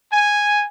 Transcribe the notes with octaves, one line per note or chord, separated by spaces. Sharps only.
G#5